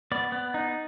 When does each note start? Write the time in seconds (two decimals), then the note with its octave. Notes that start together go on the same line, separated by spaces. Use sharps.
0.12 B3 D5
0.32 B3
0.54 D#4